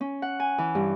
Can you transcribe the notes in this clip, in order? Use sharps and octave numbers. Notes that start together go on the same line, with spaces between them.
C#4
F#5
G#5
E3
G2